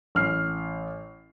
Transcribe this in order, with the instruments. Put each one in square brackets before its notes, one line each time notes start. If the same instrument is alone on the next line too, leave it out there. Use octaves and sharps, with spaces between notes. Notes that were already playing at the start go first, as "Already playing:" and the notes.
[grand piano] A1 F6 C7